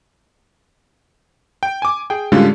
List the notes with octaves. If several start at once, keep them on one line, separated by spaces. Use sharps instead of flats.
G5
G#5 D6
G#4 G5
A2 D3 G3 G#3 C#4 F4